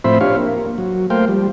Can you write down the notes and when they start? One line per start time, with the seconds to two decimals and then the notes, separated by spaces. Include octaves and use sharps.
0.04 A2 F3 C4 C5 E5 B5
0.21 D4 F4 G4 C#5 F5
0.37 A#3
0.78 F#3
1.10 A3 A#3 C5 F5 G5
1.28 F3 G3